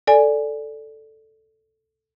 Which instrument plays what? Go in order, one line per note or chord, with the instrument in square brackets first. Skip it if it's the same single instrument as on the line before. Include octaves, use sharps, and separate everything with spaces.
[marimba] A4 D5 G#5